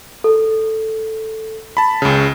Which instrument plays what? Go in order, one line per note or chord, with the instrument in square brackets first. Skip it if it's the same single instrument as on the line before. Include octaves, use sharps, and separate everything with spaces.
[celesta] A4
[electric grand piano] A5 B5
C#2 C#3